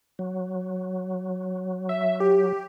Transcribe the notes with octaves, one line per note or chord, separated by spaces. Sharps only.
F#3
E5
G4